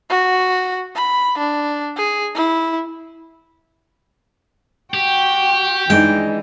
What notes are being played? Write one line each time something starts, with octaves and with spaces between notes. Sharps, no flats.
F#4
B5
D4
G#4
E4
F#4 G4 G5
E3 G#3 D4 D#4 G5